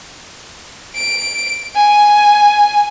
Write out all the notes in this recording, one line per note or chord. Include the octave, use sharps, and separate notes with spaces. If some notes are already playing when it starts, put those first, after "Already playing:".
D7
G#5